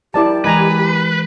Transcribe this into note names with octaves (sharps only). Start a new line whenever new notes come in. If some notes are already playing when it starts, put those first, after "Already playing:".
F#3 E4 G4 A#4 D5 A5
E3 G#3 D#4 B4 G#5 A#5